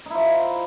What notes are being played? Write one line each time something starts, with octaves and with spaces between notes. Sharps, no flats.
F3 D#4 E4